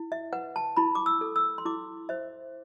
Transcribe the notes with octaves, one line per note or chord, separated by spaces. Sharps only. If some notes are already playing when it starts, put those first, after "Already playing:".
Already playing: E4
E5
B4 F#5
A5
E4 B5
D6
E6
A4
E6
C6
E4 D6
C5 E5